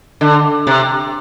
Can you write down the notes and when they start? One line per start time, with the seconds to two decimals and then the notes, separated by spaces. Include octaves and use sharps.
0.21 D3
0.67 C3